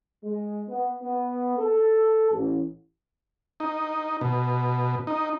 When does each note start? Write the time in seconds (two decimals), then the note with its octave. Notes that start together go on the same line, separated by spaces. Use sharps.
0.24 G#3
0.68 B3
1.02 B3
1.58 A4
2.32 A1
3.60 D#4
4.21 B2
5.07 D#4